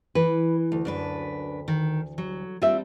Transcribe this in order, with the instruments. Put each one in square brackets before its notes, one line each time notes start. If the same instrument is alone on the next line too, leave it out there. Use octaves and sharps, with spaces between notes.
[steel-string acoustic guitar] E3 [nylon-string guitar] B4
[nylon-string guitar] D2
[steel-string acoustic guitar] F#2 D4 B4
D#3
F#3
[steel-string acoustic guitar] G3 C4 D4 [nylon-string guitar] F4 E5